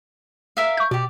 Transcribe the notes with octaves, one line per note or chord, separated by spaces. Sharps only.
A#4 E5 F5
C#6 G6
B2 G4 D5